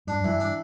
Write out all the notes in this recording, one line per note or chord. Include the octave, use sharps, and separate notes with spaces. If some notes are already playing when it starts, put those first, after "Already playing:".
G2 D4
F#2
E3
G2
D4